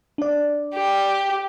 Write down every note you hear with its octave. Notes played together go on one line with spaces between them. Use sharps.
D4 D5
G4